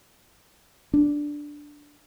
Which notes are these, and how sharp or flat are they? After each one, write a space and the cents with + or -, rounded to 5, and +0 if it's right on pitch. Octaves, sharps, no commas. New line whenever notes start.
D4 +0